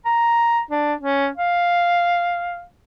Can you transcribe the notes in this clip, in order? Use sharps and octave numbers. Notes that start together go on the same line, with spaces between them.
A#5
D4
C#4
F5